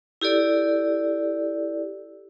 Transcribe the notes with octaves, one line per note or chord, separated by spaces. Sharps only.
E4 G4 A4 D5